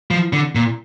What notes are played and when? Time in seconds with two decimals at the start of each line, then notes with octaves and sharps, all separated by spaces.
0.11 F3
0.33 D3
0.55 A#2